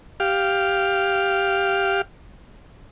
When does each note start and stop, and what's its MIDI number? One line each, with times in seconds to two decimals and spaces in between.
0.20 2.01 67
0.20 2.01 77